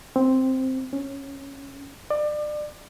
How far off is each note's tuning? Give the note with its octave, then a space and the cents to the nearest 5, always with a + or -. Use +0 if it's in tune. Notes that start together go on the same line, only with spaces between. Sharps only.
C4 +0
C#4 -10
D5 +30